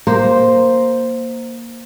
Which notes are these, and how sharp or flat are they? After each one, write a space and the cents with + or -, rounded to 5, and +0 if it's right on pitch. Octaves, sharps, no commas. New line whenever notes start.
A#3 +0 C5 +0